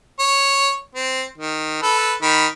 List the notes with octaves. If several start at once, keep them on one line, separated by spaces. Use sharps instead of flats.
C#5
C4
D#3
A4 B4
D#3 B5